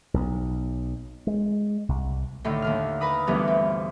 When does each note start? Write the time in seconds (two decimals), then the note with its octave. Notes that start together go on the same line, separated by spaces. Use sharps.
0.14 B1
1.27 G#3
1.89 C2
2.44 A2 D3 D#3
2.62 D#2 D3 F6
3.01 A#4 B4 A#5 B5 D#6
3.27 D2 G2 E3 B3 F6
3.48 C4